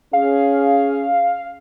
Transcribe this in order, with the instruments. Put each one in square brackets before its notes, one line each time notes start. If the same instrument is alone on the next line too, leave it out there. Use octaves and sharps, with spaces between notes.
[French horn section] C#4 G#4 [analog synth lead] F5